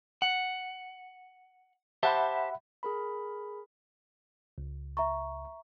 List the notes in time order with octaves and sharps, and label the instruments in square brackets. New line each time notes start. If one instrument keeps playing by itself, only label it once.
[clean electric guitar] F#5
[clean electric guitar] G4 C5 A5 [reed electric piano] E5 F#5 B5
[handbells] G#4 A#4 B5
[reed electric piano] C#2
[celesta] E5 A#5 C#6